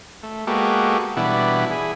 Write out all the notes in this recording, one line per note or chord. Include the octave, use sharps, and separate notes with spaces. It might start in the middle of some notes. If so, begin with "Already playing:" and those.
A3
G#3 A#3 B3 F#4 G4 A4
B2 E3 G3 B3 D4 E4
E4 G#4